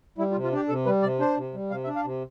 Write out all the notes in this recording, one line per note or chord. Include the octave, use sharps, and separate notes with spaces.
G3 E4
F4
C3
F4
D4 G4
C3 A4
G3 B4
C3 D5
D4 C5
C3
G3
C3 F5
E5
D4
F5
C3